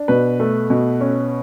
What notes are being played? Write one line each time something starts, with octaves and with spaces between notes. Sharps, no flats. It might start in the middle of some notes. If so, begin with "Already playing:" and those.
Already playing: D4
B2 B4
A3
B2
C#4